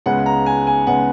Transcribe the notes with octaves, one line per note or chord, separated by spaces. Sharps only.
C#2 C#3 G#3 B3 F#5
A#5
G#5
G#5
C#3 G#3 B3 F#5